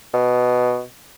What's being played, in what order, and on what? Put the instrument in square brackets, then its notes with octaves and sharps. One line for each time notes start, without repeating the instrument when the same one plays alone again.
[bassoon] B2